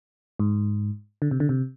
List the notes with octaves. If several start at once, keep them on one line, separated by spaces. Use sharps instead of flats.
G#2
D3
C3
D3
C3